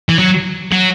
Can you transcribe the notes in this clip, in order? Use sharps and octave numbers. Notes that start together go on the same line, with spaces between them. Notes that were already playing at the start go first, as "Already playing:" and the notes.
E3
F#3
F#3